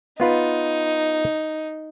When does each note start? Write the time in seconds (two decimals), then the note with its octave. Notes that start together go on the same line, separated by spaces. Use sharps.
0.20 B3 D#4 F4 B4